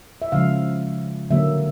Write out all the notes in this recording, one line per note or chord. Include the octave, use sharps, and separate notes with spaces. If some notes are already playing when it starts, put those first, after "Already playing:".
E5
C#3 F3 G#3 F5
D3 F#3 A#3 E5